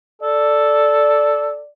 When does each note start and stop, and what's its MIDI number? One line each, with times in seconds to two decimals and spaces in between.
0.22 1.59 69
0.22 1.67 74